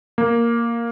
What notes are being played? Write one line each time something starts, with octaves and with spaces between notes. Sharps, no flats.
A#3